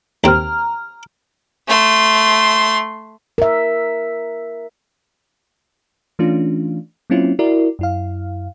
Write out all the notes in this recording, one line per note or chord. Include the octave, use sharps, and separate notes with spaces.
D#2 C4 A#5 F6
A3 C6
A#4 E5
E3 A3 C#4 D4 F4
F#3 A#3 C4 C#4 E4 F4
E4 F#4 A#4 D5
F#2 E4 F5